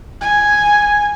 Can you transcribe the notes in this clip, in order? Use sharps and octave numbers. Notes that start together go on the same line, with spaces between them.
G#5